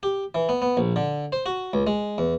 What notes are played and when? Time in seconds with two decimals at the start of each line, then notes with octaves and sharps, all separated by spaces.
0.03 G4
0.35 E3
0.49 B3
0.62 B3
0.77 A#1
0.96 D3
1.32 C5
1.46 F#4
1.73 C#2
1.87 G#3
2.18 E2